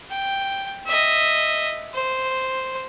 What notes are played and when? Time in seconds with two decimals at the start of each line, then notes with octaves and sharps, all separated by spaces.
0.10 G5
0.86 D#5 E5
1.94 C5